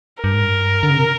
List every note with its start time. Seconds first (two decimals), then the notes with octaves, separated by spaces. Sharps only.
0.24 G2 A#4
0.33 G#2
0.42 G2
0.83 D3
0.90 C#3
0.97 C3